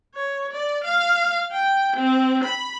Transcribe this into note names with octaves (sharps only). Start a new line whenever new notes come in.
C#5
D5
F5
G5
C4
B5